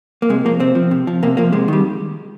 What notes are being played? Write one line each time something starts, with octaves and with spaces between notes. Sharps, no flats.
A#3
C3 G#3
F3 A#3
C3 C4
F3
C3
F3
C3 A#3
F3 A#3
C3 G#3
D#3 G3